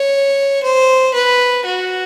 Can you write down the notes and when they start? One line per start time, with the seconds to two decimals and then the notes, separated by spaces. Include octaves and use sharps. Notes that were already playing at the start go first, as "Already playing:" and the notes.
Already playing: C#5
0.63 C5
1.14 B4
1.65 F#4